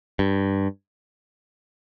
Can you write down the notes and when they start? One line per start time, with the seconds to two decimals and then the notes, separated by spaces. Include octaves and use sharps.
0.19 G2